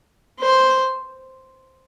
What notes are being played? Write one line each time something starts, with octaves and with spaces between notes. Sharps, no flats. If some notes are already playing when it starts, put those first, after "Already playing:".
C5